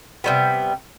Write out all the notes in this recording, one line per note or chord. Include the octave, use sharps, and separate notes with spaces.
C3 G3 B3